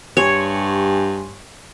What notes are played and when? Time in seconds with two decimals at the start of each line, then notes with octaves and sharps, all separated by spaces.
0.17 G2 G4 C#5 G#5 C6